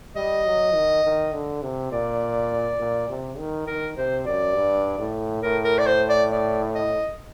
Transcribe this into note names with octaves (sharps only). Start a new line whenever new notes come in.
G3 D#5
F#3
D#3
D#3
D3
C3
A#2 D5
A#2
C3
D#3
D#3 A#4
C3 C5
F#2 D5
G2
A2
A2 A#4
A#4
D5
C5
D5
D5
D#5